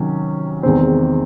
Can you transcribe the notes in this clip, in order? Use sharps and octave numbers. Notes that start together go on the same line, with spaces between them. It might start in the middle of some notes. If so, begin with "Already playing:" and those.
Already playing: C3 D#3 F#3 C#4
E2 C3 D#3 G#3 C4